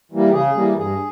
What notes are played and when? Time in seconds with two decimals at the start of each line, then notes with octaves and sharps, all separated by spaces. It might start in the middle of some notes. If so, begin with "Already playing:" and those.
0.12 E3 G3 A#3
0.29 G4
0.33 C#3 G#4
0.55 E3 G3 A#3
0.77 G2 G#4